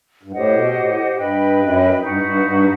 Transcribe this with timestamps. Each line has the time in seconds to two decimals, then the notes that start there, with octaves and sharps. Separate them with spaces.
0.23 G2
0.32 A2 G4 C5 D#5 F#5
0.53 B2
0.74 A2
1.16 G2 B4 D#5 G5 B5
1.59 F#2
1.94 F#2
2.01 G2 D#4 F#4 B4 F#5
2.23 G2
2.44 G2